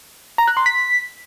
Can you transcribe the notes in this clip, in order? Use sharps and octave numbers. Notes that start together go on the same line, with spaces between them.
A#5
F#6
C6
B6